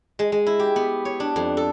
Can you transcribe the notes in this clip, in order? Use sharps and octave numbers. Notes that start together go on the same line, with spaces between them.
G#3
G#3
E4
G4
B3
C#5
D4
F2
A4